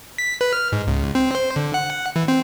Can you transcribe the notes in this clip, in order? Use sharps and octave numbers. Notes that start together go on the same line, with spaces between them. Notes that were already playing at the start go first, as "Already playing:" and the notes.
B6
B4
F6
G#2
C#2
C4
C5
D3
F#5
E3
C4